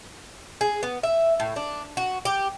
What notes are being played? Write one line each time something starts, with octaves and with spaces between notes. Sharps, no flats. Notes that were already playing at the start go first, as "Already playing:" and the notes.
G#4
B3
E5
A2
D4
F#4
G4